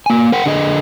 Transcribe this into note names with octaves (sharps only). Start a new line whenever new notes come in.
A#3 G#5
A#4 F#5 G5
D3 G#4 D#5